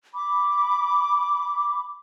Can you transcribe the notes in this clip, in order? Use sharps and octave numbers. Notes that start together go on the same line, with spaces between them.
B5 D6